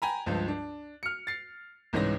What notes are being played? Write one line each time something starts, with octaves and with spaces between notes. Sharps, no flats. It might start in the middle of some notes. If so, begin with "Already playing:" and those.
G5 G#5 A#5 B5
C#2 G2 F3
D4
F6 C#7
A6 C7
C2 G#2 E3 C#4 D#4 A#6